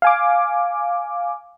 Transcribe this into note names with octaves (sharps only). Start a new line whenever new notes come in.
F5 G#5 D6